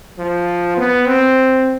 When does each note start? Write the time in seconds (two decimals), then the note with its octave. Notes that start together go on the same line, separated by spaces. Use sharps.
0.18 F3
0.77 B3
1.07 C4